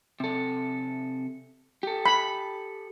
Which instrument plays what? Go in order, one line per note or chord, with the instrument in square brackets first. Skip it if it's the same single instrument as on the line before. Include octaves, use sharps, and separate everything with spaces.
[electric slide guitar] C3 A4
G4 A4
[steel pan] B5